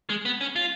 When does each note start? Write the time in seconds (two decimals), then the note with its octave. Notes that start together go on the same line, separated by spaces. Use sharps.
0.10 G#3
0.25 B3
0.41 C#4
0.56 F4